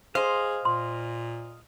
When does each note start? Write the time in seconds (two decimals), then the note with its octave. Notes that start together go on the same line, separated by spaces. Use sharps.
0.15 G#4 C5 D#5 F5
0.65 A#2 C6